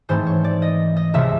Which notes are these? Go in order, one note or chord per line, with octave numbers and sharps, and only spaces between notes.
G#2 E3 A3 C4 C5
C#5
D5
D#5
D#5
C#2 C3 F3 E5